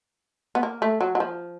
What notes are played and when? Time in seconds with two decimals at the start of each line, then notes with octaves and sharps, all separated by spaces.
0.55 B3
0.63 A#3
0.82 A3
1.01 F#3
1.15 F#3
1.20 F3